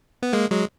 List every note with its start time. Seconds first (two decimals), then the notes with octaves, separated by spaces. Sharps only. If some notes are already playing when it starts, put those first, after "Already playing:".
0.23 B3
0.33 G#3 A#3
0.51 F#3 G#3